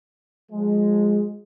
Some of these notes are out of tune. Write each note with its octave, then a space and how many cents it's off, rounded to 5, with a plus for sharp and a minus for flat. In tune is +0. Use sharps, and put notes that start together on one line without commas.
F3 +35 G#3 +0